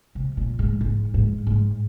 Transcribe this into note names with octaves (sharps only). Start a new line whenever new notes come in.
C3
A#2
G#2
G#2
G#2
G#2